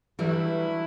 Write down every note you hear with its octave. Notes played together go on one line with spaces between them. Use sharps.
D3 E3 F#3 G3 A3 E4